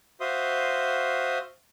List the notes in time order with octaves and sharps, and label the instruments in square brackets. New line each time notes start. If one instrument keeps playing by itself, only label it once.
[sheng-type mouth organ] F#4 C5 E5 F5 C6 D#6